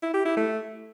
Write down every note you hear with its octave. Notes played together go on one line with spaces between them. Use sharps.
E4
G4
E4
A3